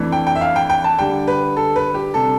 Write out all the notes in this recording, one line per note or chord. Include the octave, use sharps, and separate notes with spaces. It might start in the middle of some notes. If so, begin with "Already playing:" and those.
Already playing: F2 E3 A3 D4
G5
G5
E5
F5
G5
G5
A5
D3 G3 D4 G5
B4
A4
B4
G4
C3 G3 D4 A4